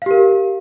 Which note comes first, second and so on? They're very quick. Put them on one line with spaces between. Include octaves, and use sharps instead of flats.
F5 G4 A#4